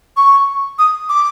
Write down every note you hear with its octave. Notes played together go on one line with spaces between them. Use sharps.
C#6
D#6
D6